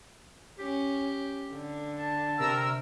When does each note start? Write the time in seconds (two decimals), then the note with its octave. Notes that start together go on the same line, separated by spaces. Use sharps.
0.59 C#4 G4
1.52 D3
1.99 A5
2.38 C3 A#4 E6